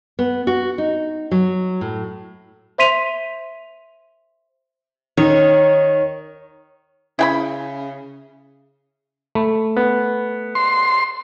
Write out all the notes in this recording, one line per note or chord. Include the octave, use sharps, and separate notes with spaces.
B3
F#4
D#4
F#3
A2
C5 E5 C6 B6 D#7 F7
D#3 C#5
C#3 E4 G5 B5
A3 B5
B3
C6